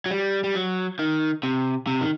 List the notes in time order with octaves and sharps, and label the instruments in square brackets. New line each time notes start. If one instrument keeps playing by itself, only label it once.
[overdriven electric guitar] F#3
G3
G3
F#3
D#3
C3
C3
D#3